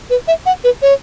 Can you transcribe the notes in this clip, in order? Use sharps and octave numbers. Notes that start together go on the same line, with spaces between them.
B4
E5
F#5
B4
C#5